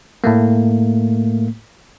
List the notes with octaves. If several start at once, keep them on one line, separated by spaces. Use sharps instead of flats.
A2 A3 A#3